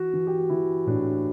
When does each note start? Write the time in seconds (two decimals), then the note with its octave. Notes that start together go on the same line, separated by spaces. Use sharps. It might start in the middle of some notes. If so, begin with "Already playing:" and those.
Already playing: E3 F#4
0.13 E3
0.27 G4
0.38 F#4
0.50 E3 E4
0.87 A2 D4